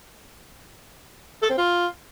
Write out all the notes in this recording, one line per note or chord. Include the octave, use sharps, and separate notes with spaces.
A4
C4
F4